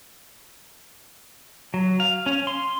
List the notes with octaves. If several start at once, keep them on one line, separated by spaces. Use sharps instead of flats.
F#3
F5
C#4
C6